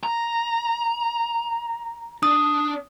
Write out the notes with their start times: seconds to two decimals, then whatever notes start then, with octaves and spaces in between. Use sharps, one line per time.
0.03 A#5
2.23 D4 D#6